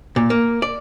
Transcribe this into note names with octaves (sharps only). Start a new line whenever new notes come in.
A#2
A#3
D5